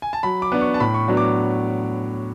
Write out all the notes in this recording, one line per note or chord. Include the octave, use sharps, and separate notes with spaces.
G#5
A5
F#3 B5
D6
B3 D4
C#6
A5
A2 B5
C#6
F#3 B3 D4
D6